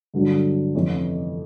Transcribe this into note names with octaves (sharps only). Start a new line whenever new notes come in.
G2 D3 F#3 A3 D4
F2 C3 E3 A3 C#4